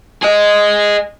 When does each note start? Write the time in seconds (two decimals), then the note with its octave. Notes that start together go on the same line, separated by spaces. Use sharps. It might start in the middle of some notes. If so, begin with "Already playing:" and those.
0.23 G#4 D#5